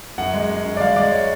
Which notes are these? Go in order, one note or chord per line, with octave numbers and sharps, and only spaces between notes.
F#2 F#5
G#3
G#3
F#2
D5
G#3 F5
G#3 D5
C#5